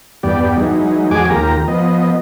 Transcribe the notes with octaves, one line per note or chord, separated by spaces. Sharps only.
E2 G2 B3 G4 D5
E3 F#3 G#3 D#4
F2 G#3 F#4 G#4 G#5 D6
D#2 A#3 F4 G4 A#5
F3 B3 D#5